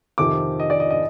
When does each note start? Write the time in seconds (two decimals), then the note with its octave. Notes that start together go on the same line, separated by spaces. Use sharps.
0.18 F2 C3 D#3 D6
0.60 D#5
0.70 D5
0.80 D#5
0.90 D#5